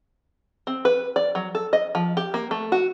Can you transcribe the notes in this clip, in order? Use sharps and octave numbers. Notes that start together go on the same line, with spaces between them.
C4
B4
D5
F#3
A4
D#5
F3
G4
A#3
A3
F#4